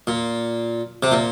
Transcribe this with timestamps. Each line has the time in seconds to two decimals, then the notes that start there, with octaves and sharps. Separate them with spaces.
0.07 A#2
1.03 C3
1.12 A#2